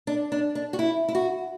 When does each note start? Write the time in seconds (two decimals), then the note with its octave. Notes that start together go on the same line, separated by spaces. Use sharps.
0.07 D4
0.32 D4
0.55 D4
0.73 F#4
0.79 E4
1.08 E4
1.15 F#4